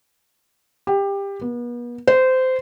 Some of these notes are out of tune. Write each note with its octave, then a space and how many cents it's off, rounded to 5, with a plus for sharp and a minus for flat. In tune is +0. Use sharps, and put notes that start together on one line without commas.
G4 +20
B3 -40
C5 -20